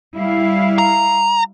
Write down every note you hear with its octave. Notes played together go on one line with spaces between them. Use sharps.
G3 E4 F5
A#5